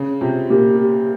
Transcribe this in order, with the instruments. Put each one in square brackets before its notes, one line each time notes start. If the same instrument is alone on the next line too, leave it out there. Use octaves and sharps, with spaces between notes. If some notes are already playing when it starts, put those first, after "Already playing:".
Already playing: [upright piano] C#3
[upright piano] C3 [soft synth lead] F4
[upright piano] A#2 [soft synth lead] G4
[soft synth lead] G4